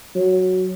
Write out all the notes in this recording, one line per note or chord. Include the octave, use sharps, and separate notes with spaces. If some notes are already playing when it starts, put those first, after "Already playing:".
F#3